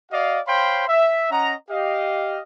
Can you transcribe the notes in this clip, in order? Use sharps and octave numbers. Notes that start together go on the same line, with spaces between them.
F#4 D5 D#5 F5
C5 C#5 F5 G5 B5 C6
E5
C#4 D#5 F#5 A#5
G4 D#5 F5